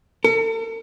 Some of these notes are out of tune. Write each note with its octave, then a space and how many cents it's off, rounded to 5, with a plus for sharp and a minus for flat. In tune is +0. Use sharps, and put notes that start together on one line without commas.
A4 +45